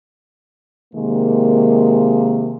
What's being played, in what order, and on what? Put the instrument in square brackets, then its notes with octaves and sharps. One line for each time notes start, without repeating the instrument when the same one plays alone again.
[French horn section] C3 D#3 G#3 A#3